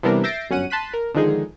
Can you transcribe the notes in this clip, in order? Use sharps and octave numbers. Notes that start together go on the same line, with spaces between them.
C3 E3 G3 B3 D4 A#4
E5 G6 A6 A#6 C7 D7
G1 F#2 C#4 F#5 D#7
A5 C6 F#6 B6 D#7
A#4
D3 D#3 F3 G#3 D#4 G#4